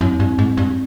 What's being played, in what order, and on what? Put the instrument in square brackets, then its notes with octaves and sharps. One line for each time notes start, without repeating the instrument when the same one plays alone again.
[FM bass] F#2 [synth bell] C4
[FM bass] G2
G#2
G2